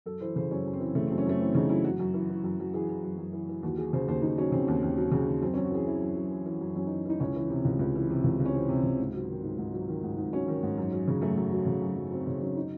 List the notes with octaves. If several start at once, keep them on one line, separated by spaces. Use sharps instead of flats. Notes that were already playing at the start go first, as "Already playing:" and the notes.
F#2 A4
E3 C5
C#3 C5
F#2 C#4
F#2
C4
E3
C#3 A3
F#2 C4
C#4
F#2 A3
E3 C4
C#3 D#4
F#2 E4
F#2 F#4
F#2
E3
E3
F#2
F#2
E3 G#4
E3
F#2
F#2
E3
E3
D#2 F#4
F#3 G#4
C#3 C5
D#2 C5
D#2 D#4
F#3 C#4
C#3 C4
D#2
D#2
F#3
C#3
D#2
F#2 C4
F#2 C#4
F#4
E3 G#4
E3 E4
F#2
F#2
E3
E3
F#2
F#2 C#4
E3 D#4
E3 D#4
C#2 C#4
E3
C3
C#2
C#2
E3
C3
C#2
C#2
C#4
E3 C4
C3
C#2
G#2
F#3
D#3
G#2
G#2
F#3
D#3
G#2
G#2
F#3 C#4
D#3
G#2
F#2
F#3
C#3
F#2 A3
F#2
F#3
C#3
F#2
F#2
F#3 C4
C#3 C#4
F#2 C#4
D#4